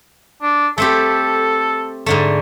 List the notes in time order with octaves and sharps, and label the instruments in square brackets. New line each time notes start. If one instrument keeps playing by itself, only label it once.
[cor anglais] D4
[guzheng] A3 C4 G4 [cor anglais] A4
[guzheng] G#2 D3 A3